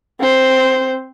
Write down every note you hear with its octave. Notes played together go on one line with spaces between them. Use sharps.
C4 C5